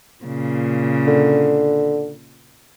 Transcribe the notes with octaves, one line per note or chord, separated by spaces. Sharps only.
A#2 C#3
D3